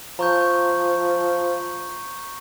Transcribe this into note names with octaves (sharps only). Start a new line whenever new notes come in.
F3 A#5 C#6 G6